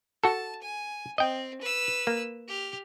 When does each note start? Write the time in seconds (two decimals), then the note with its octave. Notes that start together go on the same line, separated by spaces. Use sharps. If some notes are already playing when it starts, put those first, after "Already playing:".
0.24 F#4 A4 A5
0.62 G#5
1.18 C4 D#5 G5
1.61 B4 E6
2.07 A#3
2.48 G4 F6